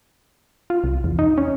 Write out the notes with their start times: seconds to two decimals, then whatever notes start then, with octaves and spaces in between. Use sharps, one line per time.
0.70 F4
0.84 C2
1.04 E2
1.19 D#4
1.38 C#4